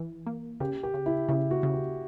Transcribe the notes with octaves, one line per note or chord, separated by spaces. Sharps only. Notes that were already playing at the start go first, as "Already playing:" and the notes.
Already playing: E3
A#3
C#3 G4
G4
C#3
E4
C#3 E4
F#4
C#3
G4